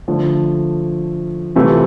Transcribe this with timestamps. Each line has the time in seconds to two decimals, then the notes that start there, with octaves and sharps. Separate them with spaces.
0.08 D3 F3 A3
1.56 C3 E3 A3 C4 F4